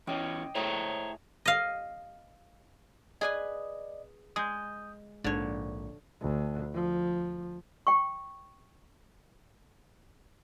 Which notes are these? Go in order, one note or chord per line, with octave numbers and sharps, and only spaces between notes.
E2 C#4 D#5 G5 D6
A2 G#4 C5 C#5 A5 A#5
D#5 F5
G#4 B4 D5 D#5 G#5
G#3 D#6 G6
A#1 G#2 D3 C4 C#5
D2
F3
G5 C#6